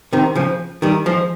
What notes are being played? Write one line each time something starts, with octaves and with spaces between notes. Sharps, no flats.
C3 D#3
C#3 F3
D#3 G3
F3 G#3